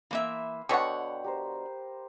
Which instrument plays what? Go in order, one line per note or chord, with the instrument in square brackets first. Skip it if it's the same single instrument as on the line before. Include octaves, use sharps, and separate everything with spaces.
[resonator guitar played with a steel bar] E3 A#3 E5 [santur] F5 B5 C6
[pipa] B2 D3 [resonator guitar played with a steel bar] C#5 F#5 [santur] G5
[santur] G4 A#4 C5